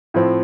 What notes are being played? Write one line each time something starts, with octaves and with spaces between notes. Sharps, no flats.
A2 F3 C4